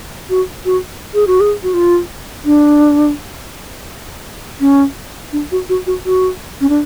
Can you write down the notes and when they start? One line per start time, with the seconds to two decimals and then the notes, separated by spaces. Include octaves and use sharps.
0.30 F#4
0.65 F#4
1.14 G#4
1.27 F#4
1.40 G#4
1.63 F#4
1.74 F4
2.45 D4
4.60 C#4
5.32 D4
5.52 F#4
5.69 F#4
5.87 F#4
6.06 F#4
6.61 C#4
6.69 D4